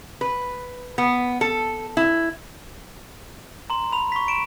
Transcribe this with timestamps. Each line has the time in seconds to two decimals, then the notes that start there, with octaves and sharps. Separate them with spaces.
0.21 B4
0.98 B3
1.41 A4
1.97 E4
3.70 A#5 C6
3.92 B5 F7
4.12 C#6 B6
4.28 D7 E7